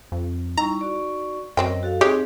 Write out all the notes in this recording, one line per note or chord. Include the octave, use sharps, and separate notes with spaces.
F2
G3 D#4 E4 A#5 C#6
F#4 D5 C#6
F#2 F#3 C4 A#4 C#5 D#5 G5
F#4 A4 F5
G#3 C4 D#4 G4 G#4 C#5